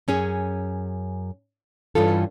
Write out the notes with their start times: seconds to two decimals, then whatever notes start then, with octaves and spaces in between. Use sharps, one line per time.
0.08 F#2 C#4 G#4
1.95 G2 E3 C#4 F4 A4